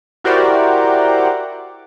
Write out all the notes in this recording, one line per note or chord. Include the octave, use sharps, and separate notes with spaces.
E4 F#4 G4 A#4 C5 D5